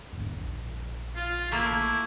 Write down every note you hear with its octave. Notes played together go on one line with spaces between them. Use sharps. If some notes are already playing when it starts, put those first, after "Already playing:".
E2 G#2 D3
A#1
F4
A3 A#3 E4